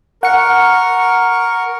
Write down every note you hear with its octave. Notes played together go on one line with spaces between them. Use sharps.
A#4 F#5 C#6 C#7